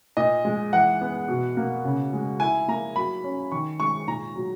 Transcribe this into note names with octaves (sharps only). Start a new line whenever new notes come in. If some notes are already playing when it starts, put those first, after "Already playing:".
A#2 D#5
G#3
E3 F#5
B3
B2
A#3
C#3
G#3
E4 G#5
A#3 A#5
F#3 B5
C#4
D#3 C#6
G#3 C#6
A#2 A#5
F#3